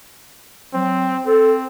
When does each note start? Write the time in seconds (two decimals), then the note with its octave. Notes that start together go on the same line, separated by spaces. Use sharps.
0.74 F#3 C4
1.26 C4 A4